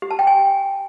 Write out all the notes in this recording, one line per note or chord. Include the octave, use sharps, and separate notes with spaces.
G4
A5
G5
G#5